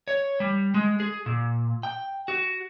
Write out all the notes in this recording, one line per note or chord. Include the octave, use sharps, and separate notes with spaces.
C#5
G3
G#3
G#4
A#2
G5
F#4